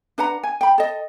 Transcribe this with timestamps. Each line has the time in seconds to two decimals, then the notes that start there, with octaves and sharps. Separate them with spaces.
0.18 D4 B4 F#5 A#5
0.44 G#5
0.61 G5 B5
0.78 A4 D#5